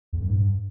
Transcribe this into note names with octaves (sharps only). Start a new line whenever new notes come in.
E2
F#2
G#2
G2